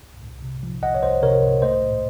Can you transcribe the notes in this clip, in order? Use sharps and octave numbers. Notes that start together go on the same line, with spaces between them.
C2
C2
C3
F3
C2 D#5 F#5
C#5
C2 C5 D#5
C3 A#4 C#5
C2
A3 C5 D#5
A2